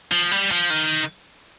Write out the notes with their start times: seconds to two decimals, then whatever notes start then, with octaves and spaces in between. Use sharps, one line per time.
0.11 F3
0.31 G3
0.51 F3
0.70 D#3